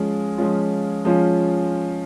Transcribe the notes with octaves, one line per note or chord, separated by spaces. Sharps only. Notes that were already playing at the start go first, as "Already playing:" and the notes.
Already playing: F3 G#3 C#4 F4
F3 G#3 C#4 F4
F3 G#3 C#4 F4